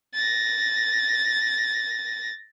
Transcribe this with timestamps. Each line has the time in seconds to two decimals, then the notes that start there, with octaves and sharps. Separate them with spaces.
0.14 A6 A#6